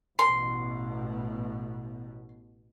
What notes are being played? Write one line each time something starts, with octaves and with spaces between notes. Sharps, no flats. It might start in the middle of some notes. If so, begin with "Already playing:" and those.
A1 B2 C6